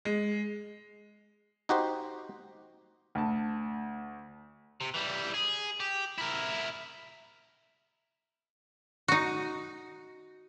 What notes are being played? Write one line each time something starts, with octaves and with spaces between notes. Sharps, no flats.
G#3
D#4 F#4 G4 C5
D2 A5
C3
E3 G3
G#4
G4
E4 A#4
D#4 F#4